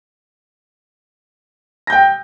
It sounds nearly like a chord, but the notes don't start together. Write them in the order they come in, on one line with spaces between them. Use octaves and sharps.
A#6 G6 G5